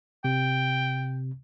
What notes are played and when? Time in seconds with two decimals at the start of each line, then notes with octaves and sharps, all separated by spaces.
0.24 C3 G5